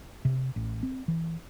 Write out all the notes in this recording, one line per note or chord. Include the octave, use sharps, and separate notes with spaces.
C3
A1
C4
E3